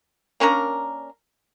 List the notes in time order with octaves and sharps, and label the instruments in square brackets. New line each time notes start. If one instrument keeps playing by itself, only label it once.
[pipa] A#3 C#4 D4 A#4